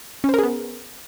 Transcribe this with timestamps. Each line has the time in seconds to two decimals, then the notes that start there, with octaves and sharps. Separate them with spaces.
0.24 C#4
0.29 C5
0.34 A#4
0.39 G#4
0.43 B3